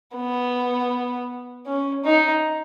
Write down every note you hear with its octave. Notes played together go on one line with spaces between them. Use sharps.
B3
C#4
D#4